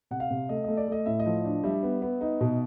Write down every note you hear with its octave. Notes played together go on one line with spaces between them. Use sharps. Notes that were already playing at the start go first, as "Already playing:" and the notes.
C3 F#5
F5
C3
A3 D#5
A3 D#5
D5
A3 D#5
A2 E5
D#5
F3
D4
G3 E5
B3
B3
D#4
B2